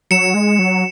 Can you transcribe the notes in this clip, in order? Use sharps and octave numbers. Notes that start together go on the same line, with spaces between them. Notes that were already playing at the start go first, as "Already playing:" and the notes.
F#3 C#7 E7
G#3
F#3